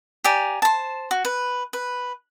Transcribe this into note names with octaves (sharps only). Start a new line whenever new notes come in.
G4 D5 G#5 A#5
C5 A5
F#4
B4
B4